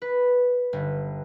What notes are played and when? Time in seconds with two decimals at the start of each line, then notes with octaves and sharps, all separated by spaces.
0.02 B4
0.73 G1